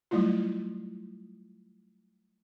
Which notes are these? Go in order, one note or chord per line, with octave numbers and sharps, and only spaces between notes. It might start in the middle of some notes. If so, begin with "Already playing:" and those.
F#3 G3 A3 E4 F4